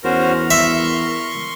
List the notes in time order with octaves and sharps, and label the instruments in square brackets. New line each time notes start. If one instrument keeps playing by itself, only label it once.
[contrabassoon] E2 [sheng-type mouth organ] C#4 F#4 C5 [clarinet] A#4
[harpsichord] E5 [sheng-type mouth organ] C6 C#6